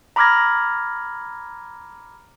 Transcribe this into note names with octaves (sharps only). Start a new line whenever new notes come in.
A#5 B5 D6 F6 G#6 A#6